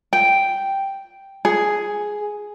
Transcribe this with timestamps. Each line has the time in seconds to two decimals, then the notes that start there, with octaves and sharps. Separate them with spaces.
0.13 G5
1.45 G#4